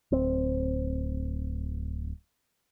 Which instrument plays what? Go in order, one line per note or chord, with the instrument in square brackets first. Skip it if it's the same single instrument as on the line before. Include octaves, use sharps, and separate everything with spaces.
[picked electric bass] D1 C4